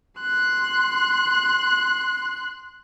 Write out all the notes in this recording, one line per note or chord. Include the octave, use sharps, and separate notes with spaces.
C6 F#6